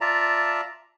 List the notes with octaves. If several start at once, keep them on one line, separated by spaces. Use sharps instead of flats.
F4 D5 E5 A5 A#5